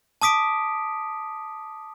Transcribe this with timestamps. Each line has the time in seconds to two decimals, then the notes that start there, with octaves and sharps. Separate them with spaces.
0.22 A5 D6 D#6 B6 D7